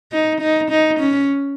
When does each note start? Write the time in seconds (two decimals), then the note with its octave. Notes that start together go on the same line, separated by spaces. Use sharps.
0.12 D#4
0.41 D#4
0.71 D#4
1.00 C#4